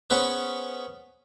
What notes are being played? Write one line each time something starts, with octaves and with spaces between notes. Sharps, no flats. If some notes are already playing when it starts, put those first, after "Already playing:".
B3 C#4 G#4 B4 C5